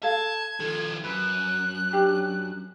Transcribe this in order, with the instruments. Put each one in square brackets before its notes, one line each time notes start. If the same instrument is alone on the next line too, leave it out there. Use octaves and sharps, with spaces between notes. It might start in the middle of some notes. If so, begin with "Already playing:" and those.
[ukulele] A4 F5 [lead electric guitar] A5 [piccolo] G#6
[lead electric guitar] D#3 F3 [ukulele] A4
[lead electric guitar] F#2 [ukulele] B4 [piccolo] F#6
[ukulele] C#4 D4 G4